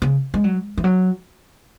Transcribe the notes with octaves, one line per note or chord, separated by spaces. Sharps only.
C#3
G#3
F#3
E3
F#3